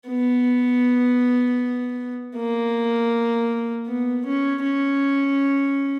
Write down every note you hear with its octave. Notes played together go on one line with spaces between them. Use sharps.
B3
A#3
B3
C#4
C#4